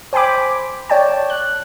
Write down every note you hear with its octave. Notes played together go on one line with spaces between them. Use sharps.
C5 G5 G#5 B5 D6
C#5 D5 G5 A5
F#6